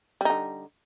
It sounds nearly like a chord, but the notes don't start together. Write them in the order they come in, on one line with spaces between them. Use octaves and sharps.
G3 D#4 D3